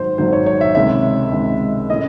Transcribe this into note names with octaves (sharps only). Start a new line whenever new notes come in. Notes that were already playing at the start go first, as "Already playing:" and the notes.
Already playing: G#1 G#2 F#3 A3 C5
G#1 G#2 F#3 A3 C5
C#5
C#5
E5
C#2 C3 D#3 G#3 E5
C#2 C3 D#3 G#3
A2 E3 A3 C#4 D#5